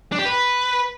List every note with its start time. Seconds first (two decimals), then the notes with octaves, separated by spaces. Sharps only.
0.12 D4
0.19 G4
0.25 B4